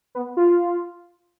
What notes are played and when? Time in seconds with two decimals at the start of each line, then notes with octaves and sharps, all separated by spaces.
0.15 B3
0.37 F4